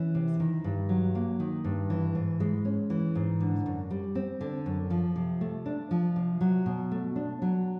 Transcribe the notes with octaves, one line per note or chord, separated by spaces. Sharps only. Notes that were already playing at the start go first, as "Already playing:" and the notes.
Already playing: E3 C#4
C3
D#3
G2
F#3
A#3
D#3
G2
E3
G#2
G#3
C#4
E3
G#2
D3
F#2
G3
C4
D3
F#2
F3
C3
A3
D4
F3
C3
F#3
B2
A3
D4
F#3